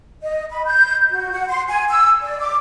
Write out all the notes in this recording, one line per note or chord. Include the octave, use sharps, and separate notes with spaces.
D#5
B5
G6
F#4
F#5
C6
G#5
E6
D5
D6